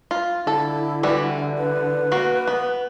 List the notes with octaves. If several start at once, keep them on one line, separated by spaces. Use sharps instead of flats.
F4
D3 E4 A4
E3 G3 F#4
B4
A#3 F#4
B3